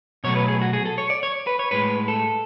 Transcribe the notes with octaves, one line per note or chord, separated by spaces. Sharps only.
B2 F#3 A3 C#5
B4
G#4
F#4
G#4
A4
C#5
D5
C#5
B4
C#5
A2 G#3 B4
A4